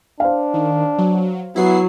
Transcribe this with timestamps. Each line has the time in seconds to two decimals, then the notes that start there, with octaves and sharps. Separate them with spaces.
0.20 D4 C5 F5
0.54 D#3
0.98 F#3
1.56 F#3 B3 E4 C7